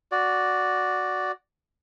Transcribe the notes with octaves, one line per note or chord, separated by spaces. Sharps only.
F#4 D5